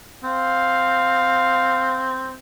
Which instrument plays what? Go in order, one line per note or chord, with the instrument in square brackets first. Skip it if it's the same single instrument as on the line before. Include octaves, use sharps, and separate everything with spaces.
[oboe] C4 [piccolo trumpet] F5